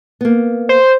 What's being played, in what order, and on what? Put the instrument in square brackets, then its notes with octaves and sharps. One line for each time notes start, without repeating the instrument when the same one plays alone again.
[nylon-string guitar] A#3 B3
[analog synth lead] C5